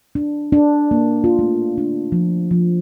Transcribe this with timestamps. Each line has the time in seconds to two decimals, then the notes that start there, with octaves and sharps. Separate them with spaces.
0.15 D4
0.52 D4
0.91 A#3
1.24 F4
1.39 A3
1.78 D4
2.12 F3
2.51 F3